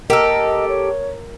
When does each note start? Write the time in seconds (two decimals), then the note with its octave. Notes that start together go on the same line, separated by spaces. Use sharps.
0.10 G4 A4 A#4 D#5
0.69 C#5